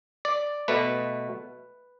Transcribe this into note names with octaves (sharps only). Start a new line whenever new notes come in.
D5
B2 A3 B4